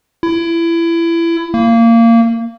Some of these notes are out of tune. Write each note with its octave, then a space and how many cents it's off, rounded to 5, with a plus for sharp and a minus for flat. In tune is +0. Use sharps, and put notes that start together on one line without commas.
E4 +25
A#3 -20